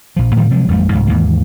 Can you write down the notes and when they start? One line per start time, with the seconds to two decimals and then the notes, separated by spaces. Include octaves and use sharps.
0.16 A#1 F3
0.36 A2 D#3 F3 G3
0.50 C3 F3 F#3 G#3
0.68 A1 F2 G3 A3
0.92 C2 F2 G#2 F#3
1.07 D#2 G#2 E3 A#3